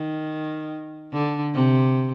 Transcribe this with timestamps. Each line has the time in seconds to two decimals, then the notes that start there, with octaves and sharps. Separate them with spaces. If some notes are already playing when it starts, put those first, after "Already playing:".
Already playing: D#3
1.13 D3
1.54 C3